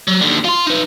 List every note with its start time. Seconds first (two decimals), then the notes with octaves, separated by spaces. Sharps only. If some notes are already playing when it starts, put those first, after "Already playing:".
0.08 F#3
0.22 D#2 D3
0.45 F4 C6
0.67 D#4 B4